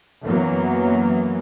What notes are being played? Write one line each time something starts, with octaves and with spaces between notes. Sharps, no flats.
F#2 E3 F#3 A#3 B3